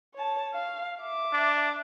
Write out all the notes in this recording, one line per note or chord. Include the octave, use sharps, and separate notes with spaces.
C#5 A5
F5
E5 D6
D4